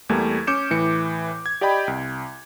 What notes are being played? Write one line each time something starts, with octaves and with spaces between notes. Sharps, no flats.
E2 G3 A3 A#3 G#6
C#4 D6 G6 C#7 E7
A2 E3 C#7
G#6
G4 D5 D#5 G5 B5
C2